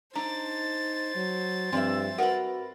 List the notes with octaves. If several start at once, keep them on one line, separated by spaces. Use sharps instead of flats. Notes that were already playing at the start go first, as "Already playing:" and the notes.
D4 D#4 C5 A#5 A6
F#3
G2 F3 C4 D5 E5
F#4 A#4 B4 F#5